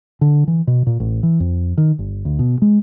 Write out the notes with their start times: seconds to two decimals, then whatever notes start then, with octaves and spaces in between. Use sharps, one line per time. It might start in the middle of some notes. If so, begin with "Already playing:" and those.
0.21 D3
0.48 E3
0.67 B2
0.87 A#2
1.00 A1
1.23 E3
1.40 F2
1.78 D#3
1.99 G1
2.25 D2
2.39 B2
2.62 G#3